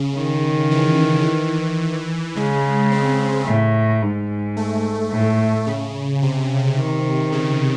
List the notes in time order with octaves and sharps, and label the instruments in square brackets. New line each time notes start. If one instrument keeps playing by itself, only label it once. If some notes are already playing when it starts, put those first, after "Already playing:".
Already playing: [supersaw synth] C#3
[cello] D#3
[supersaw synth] E3
[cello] C#3 [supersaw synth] G#3
[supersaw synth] C4
[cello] A2
G#2
[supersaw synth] A3
[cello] A2
[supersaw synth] C#3
C3
[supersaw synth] C3 [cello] D#3
[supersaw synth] C#3